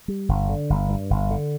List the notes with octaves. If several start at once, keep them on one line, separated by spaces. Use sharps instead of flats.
G3
G1
D3
G1
G2
G1
D3